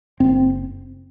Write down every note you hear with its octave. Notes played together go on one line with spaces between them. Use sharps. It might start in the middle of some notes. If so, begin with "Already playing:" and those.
F#1 C4